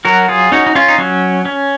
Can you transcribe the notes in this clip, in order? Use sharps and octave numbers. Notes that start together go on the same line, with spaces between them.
F#3 F#4 A#4
F4 G#4
C#4 D#4 F#4
D#4
C#4 F4
D#4
F#3 C#4
C#4